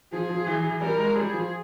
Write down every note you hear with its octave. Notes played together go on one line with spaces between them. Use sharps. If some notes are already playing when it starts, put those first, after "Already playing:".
F3 G#4
F3
E3
E3
G3 A#4
G#3
G3 G#4
F3